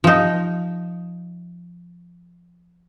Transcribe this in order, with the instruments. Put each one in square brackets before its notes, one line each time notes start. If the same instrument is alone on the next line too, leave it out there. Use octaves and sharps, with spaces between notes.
[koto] F3 D#4